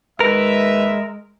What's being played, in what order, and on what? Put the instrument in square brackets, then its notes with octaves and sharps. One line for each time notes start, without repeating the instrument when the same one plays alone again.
[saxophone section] D#2 B4 [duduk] G#3 [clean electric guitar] A#4 [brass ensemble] E5